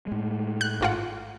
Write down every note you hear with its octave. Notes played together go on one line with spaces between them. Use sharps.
A2 G#3
F#6
G#1 F4 F#5